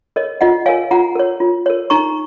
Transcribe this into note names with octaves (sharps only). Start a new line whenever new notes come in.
A#4 C#5 D#5
F4 D#5 F#5
A#4 C#5 F5 G#5
F4 F#5 A#5
A#4 C#5
F4
A#4 C#5
D#4 A#5 C#6